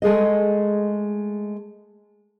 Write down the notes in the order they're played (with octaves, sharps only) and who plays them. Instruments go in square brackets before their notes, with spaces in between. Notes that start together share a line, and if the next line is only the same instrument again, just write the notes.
[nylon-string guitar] G#3 A3 G#4 D#5